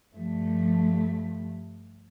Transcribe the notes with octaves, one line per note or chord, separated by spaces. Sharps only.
G2 F3 A3